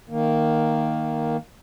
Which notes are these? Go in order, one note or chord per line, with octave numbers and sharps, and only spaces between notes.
D#3 A#3